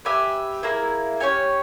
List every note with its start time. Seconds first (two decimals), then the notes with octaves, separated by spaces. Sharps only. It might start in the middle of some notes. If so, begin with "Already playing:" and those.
0.05 G4 B4 E5 G#5
0.63 A#3 E4 G#4
1.20 C#4 G4 C#5 G#5